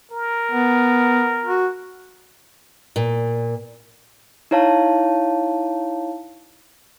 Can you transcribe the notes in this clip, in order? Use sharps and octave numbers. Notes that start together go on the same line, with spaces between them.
A#4
B3
F#4
A#2
D#4 E4 C#5 F5 A5